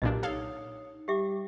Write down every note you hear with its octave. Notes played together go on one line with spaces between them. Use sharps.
B1 A#2 D4 G4 D#5
D#4 A4 C#5 F5 G#6
G3 G4 E5 D6